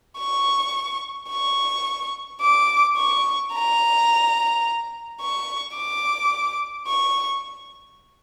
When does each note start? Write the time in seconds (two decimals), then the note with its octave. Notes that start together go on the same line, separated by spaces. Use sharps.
0.19 C#6
1.30 C#6
2.41 D6
2.97 C#6
3.53 A#5
5.21 C#6
5.76 D6
6.88 C#6